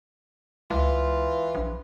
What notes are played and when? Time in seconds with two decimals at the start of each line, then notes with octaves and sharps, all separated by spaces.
0.70 C#2 E3 F4
1.55 A#1